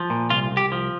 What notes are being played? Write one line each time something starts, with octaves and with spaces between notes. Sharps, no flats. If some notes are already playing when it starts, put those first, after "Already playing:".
Already playing: F3
A#2
C2 F4
C2
G4
F3